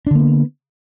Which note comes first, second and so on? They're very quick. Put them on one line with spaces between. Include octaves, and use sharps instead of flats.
D4 D3 A#3 B3